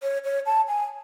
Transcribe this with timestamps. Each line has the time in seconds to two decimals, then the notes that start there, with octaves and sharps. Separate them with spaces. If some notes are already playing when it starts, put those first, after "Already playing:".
0.03 C#5
0.24 C#5
0.46 A5
0.68 G#5